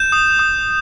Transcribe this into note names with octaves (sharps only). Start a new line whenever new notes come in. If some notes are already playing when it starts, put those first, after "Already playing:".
Already playing: G6 E7
D#6
D#6